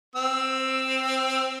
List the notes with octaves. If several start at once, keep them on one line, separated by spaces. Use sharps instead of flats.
C4 E6